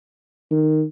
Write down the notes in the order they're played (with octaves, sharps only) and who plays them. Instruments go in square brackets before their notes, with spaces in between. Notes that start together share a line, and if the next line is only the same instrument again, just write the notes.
[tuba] D#3